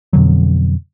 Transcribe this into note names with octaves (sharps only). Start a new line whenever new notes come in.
F2 B2 D3 F#3